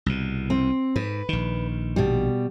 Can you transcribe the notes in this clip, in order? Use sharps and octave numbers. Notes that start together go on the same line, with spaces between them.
C2 B2
C4
G#2 B4
A#1 D#3
B2 G3